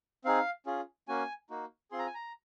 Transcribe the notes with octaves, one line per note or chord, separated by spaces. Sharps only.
C4 D#4 G#4 F5
C#4 F4 G#4
A#3 C#4 F#4 G#5
A#3 D#4 F#4
C4 F4 G#4 C6
A#5
G#5
A#5